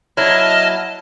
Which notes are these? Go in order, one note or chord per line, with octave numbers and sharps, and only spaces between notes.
F#3 A#3 E4 D#5 A5 F6